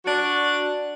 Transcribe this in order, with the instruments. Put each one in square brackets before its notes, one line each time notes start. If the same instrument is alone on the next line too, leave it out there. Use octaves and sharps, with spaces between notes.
[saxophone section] D4 F#4